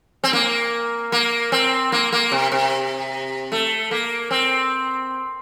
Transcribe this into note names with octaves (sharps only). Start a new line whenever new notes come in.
C4
A#3
A#3
C4
A#3
A#3
C3
C3
A3
A#3
C4